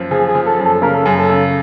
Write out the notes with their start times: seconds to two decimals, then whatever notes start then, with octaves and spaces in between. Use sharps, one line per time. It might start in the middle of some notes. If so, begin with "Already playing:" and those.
Already playing: F#2 F3
0.11 F3 G#4
0.28 G#4
0.35 F3
0.46 A4
0.59 F#2
0.65 A4
0.82 C#3 A#4
0.94 A4
1.06 F#2 G#4
1.19 A4
1.30 C#3